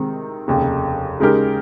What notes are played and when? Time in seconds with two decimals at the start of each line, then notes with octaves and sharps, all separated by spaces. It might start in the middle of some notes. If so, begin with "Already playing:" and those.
Already playing: C3 D#3 G#3 C4
0.48 F1 D#2 C#3
1.20 C#3 G#3 D#4 G4 A#4